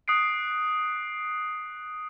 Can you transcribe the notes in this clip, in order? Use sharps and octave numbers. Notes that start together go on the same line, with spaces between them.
D#6 F#6 C7 D7